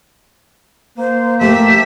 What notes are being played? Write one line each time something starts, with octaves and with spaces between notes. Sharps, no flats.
A#3 C5
A3 G4 A4 A#4 E5